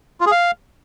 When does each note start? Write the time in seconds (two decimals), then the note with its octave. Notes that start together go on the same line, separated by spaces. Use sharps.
0.21 F4
0.26 G#4
0.32 F5